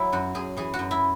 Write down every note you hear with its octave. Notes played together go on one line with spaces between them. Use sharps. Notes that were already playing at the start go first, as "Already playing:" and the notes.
Already playing: F#3 E4
F#2 F#4
F#2 G#4
E3 G#4
F#4
F#2
E4